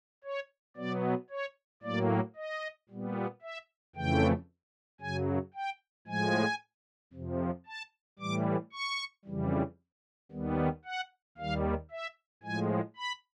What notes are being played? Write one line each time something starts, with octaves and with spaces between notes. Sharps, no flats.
C#5
B2 F#3 B3 D5
C#5
A2 F#3 A#3 D5
D#5
A#2 G3 B3
E5
F2 C#3 E3 A3 G5
F#2 C#3 F#3 G#5
G5
A2 F3 G#3 G#5
F2 C3 F3
A5
A2 E3 G3 D6
C#6
F2 C#3 E3 G3
D#2 D#3 G3 B3
F#5
D#2 D#3 G3 F5
E5
A2 F3 G#3 G#5
B5